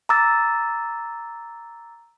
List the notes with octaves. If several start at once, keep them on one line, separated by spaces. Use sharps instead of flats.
A#5 D6 E6 A6